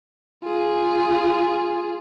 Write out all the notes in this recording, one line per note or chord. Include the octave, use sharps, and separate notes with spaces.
F4 G#4